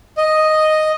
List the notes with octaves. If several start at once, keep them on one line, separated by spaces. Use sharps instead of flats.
D#5